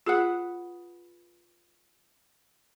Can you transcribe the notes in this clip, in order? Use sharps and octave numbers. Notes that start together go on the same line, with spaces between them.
F4 G#4 B4 F#5 F#6